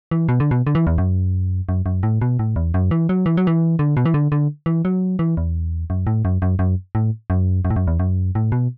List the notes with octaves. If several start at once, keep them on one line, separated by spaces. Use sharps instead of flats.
E3
B2
D3
B2
D3
E3
E2
F#2
F#2
F#2
A2
B2
A2
E2
F#2
E3
F#3
E3
F#3
E3
D3
B2
E3
D3
D3
E3
F#3
E3
E2
F#2
A2
F#2
F#2
F#2
A2
F#2
F#2
A2
F#2
E2
F#2
A2
B2